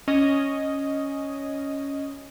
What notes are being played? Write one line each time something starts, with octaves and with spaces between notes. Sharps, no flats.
C#4 D#5